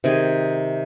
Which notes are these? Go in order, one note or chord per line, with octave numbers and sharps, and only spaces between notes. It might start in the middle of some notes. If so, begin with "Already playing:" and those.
C3 D#3 G#4